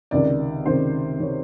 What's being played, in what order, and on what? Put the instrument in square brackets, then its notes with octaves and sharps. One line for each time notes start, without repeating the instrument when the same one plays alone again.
[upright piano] C#2 C3 D#3 D5
C#2 C3 D#3 C5
C3 D#3 C#5